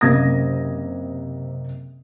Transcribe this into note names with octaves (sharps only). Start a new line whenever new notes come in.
F#1 C3 A#3 D#6 G#6 A#6